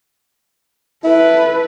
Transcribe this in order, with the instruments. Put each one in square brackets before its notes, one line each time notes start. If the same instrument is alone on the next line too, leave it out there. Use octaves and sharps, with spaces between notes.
[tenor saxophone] E4 [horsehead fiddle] A4 B4